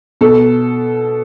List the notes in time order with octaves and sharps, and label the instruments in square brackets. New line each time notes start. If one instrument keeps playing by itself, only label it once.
[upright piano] B2 A4